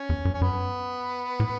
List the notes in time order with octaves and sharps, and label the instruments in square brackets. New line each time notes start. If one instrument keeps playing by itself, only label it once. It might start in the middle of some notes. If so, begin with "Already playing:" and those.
Already playing: [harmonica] C#4
[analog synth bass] E2
F#2
[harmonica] C#4
[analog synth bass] F#2 [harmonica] B3
[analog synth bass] A2